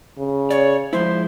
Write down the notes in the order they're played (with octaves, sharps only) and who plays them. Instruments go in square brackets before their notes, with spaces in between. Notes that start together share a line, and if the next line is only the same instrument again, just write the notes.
[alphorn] C#3
[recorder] C#5 [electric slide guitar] D5
[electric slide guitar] F3 G#3 E4 [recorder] C5